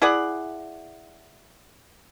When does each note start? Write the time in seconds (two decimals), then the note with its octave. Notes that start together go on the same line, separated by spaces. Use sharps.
0.02 E4 G#4 D5 F#5